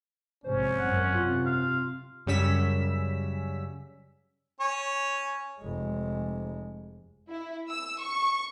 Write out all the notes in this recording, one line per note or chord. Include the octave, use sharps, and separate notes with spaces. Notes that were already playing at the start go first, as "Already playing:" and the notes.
A#1 G#2 C3 C#4 C5
G#1 F#2 A#2 F#5
C3 F4
F5
F#2 C#3 G3 C#4 E6 B6
C#4 C#5
F1 G#3
E4
E6
C#6